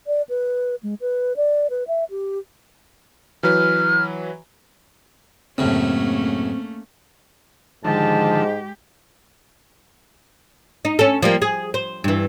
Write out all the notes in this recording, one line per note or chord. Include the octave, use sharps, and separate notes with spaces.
D5
B4
G#3
B4
D5
B4
E5
G4
E3 F#3 B4 F6
F#2 A2 C#3 A3 A#3 C4 C#4
G#2 D3 D#3 F3 G#3 G4 A5
D#4
C#4 A4
F3 G3 A#3
G#4
C5
G2 E3